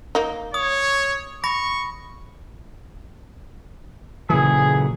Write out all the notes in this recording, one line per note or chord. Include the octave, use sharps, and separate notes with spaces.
A#3 D#4
C#5 D#6
B5 C#6 A#6
A#2 C#3 E3 F#3 G#4